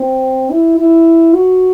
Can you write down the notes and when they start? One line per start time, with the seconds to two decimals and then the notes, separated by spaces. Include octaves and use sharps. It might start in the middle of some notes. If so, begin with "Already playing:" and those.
Already playing: C4
0.50 E4
0.78 E4
1.33 F#4